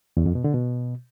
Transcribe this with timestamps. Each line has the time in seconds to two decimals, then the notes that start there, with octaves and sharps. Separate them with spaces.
0.17 E2
0.26 F2
0.35 B2
0.44 D3
0.54 B2